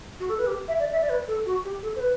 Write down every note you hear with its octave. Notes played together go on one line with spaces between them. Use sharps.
F#4
A4
B4
G4
E5
D5
E5
D5
B4
A4
F#4
G4
A4
C5
B4